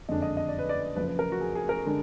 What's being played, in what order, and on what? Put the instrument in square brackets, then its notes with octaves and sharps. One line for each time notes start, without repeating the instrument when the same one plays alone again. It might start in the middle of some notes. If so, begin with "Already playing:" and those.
[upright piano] F#1 F2 D3 G#3 D4 D#5
D#5
D#5
D5
B4
D5
F#1 F#2 F3 B4
B4
A#4
F#4
G#4
G#4
A#4
D3 G#3 D4